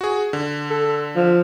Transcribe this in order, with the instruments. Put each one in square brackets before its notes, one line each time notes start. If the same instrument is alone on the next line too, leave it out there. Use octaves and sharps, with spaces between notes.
[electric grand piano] F#4 G#4
D3
[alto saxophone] A4
F3